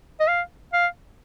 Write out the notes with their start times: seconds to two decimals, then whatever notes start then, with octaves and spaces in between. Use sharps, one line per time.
0.20 D#5
0.28 F5
0.73 F5